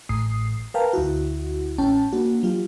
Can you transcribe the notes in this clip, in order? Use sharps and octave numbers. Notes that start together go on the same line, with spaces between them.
A1 A2 D#6 C7
A#4 B4 F5 G5 A5 A#5
D2 E4 F#4
A1 C#4 G5 A5
A#3 D4 F#4
F#3 F4 G4